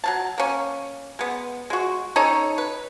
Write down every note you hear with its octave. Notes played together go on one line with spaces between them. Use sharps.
F#3 D4 A5
A#3 C#4
G#3 B3
G#3 F#4
C#4 D#4 A4 C#5
B4